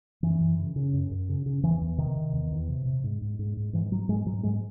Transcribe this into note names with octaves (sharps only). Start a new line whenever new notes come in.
F#2 E3
F#2
C#3
C#3
F#2
F#2
C#3
C#3
E2 E3
E2
C3 D#3
C3
E2
E2
C3
C3
G#2
G#2
G#2
G#2
G#2 E3
G#2 F#3
G#2 G#3
G#2 F#3
G#2 G#3